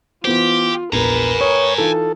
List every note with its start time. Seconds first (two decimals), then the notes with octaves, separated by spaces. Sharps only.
0.25 E3 B3 F4 G4 C5
0.93 A#1 E2 A#4 B4 G#5 A#5
1.41 C#5 D#6
1.78 E3 D#4 F4 A4